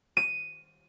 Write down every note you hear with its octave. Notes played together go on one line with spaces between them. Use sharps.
D#7